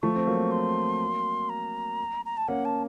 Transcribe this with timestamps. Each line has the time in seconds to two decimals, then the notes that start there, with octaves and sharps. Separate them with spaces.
0.02 F3 A3 C#6
0.16 C4
0.27 F#3 A#3
0.51 C6
1.49 A#5
2.25 A#5
2.37 A5
2.48 A#3 C#4 F#5
2.65 A5